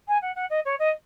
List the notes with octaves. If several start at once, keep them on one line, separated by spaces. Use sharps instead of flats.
G#5
F#5
F#5
D#5
C#5
D#5